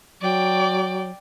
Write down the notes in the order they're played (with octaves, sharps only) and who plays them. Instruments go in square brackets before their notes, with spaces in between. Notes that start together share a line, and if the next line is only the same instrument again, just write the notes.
[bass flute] F#3 [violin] D5 G5